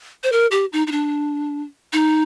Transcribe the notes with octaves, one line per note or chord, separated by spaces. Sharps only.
C5
A#4
G4
D#4
D#4
D4
D#4